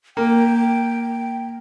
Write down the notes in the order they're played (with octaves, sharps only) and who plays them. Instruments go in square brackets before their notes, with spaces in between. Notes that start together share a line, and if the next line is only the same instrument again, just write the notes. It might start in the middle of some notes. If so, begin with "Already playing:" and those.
[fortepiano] A#3 [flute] G5